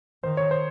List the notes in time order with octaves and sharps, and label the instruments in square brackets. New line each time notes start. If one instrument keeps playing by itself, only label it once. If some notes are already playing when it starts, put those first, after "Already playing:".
[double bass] D#3 [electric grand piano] C5
[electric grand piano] C#5
C5